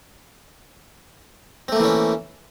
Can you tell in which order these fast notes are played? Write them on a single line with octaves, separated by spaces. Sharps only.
C4 A3 A#3 E3 C#4